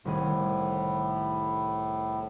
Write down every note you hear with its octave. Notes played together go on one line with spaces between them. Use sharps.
C2 A2 D#3 G#4